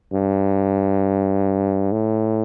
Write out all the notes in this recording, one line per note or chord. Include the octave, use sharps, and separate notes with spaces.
G2
A2